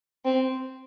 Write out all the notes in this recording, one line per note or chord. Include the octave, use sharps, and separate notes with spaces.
C4